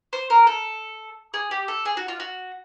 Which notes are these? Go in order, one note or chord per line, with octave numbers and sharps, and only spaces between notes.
C5
A#4
A4
G#4
G4
A4
G#4
F#4
F4
F#4